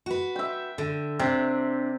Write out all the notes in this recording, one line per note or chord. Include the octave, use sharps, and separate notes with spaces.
F#4 B4
E5 G5
D3
C3 D4